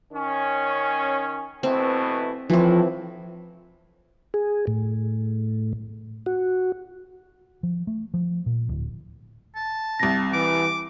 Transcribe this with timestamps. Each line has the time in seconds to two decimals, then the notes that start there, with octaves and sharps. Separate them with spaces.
0.13 D#3 C#4
1.63 B2 E3 A3 C4
2.50 A2 E3 F3 C4
4.34 G#4
4.67 A2
6.26 F#4
7.63 F3
7.87 A3
8.14 F3
8.46 A#2
8.69 D1
9.56 A5
10.00 C2 C3 A#6
10.33 E3 D6